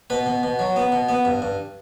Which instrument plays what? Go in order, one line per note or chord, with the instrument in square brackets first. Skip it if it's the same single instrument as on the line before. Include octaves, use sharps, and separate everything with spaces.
[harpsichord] B2 B4
B2
B2
F#3
B3
B2
B3
G2
G2